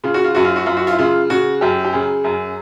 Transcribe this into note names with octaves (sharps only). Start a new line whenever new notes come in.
C#3 F4
F#4
F4
F#2 F#4
F4
F#4
F#2 F4
F#4
F4
E4
C#3 F4
C#3 F#4
F#2 G4
G4
C#3 G#4
F#2